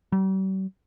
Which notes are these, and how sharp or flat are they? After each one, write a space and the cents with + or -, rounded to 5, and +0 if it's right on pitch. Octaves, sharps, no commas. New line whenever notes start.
G3 -45